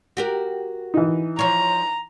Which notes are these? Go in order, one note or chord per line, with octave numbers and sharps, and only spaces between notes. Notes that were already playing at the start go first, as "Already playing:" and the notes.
F#4 G4 A#4
E3 D#4
F3 C#5 A#5